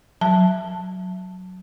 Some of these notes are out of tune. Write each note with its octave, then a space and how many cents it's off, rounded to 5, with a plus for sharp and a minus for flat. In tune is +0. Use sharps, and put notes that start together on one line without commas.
F#3 +0 A5 +5